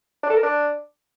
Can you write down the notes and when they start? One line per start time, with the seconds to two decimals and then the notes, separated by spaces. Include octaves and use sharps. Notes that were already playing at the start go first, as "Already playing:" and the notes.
0.23 D4
0.30 A4
0.36 A#4
0.43 D4